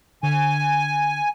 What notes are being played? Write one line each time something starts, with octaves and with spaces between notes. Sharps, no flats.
D3 G#5